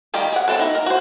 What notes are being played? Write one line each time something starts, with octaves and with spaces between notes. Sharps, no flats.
D#3 G3 D#4 F4 G4
G#4 F#5
C4 D#4 A4 B4
D#4 E4
A#4
F#4 C5